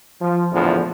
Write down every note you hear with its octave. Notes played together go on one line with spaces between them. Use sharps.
F3
A#1 E2 A2 D3 F3